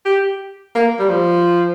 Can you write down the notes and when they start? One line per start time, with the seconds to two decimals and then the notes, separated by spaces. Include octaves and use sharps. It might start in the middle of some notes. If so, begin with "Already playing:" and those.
0.05 G4
0.75 A#3
0.99 G3
1.10 F3